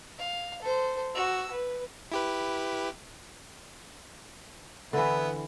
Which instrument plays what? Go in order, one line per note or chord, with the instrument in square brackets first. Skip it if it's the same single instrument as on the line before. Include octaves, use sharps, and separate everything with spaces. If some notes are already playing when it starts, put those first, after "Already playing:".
[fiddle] F5
A4 C5
F#4 E6
B4
[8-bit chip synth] E4 G4 B4
[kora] D3 E3 [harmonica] B3 E4